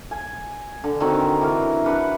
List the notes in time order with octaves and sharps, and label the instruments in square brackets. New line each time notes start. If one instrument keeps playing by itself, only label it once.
[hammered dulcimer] G#5
D3
D3 D#3 C4 F#4
E3 A#4
D4 B4 F#5